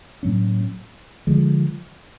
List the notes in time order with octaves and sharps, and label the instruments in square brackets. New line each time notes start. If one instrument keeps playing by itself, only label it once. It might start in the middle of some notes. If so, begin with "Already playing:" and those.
[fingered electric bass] A2 F#3 A#3 C#4
D3 F3 G#3